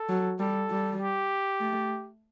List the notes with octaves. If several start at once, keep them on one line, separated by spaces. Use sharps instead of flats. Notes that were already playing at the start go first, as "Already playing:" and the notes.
Already playing: A4
F#3
G3 A4
G3
G4
A3